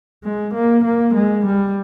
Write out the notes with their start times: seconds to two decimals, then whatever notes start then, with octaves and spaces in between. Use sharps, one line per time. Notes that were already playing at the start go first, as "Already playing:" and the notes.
0.24 G#3
0.53 A#3
0.84 A#3
1.14 G#3
1.45 G3